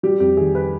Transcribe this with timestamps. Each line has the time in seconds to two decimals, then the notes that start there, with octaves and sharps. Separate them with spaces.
0.03 G3 G4
0.20 F2 G4
0.37 D#3 G#4
0.55 B4